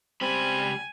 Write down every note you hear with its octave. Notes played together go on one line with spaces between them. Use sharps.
C#2 G3 C4 G#5 B5